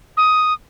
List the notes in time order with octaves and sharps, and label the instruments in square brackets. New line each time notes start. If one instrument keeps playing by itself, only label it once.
[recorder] D#6